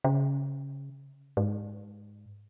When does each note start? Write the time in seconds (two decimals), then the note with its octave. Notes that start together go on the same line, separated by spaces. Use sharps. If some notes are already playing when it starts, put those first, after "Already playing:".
0.04 C#3
1.37 G#2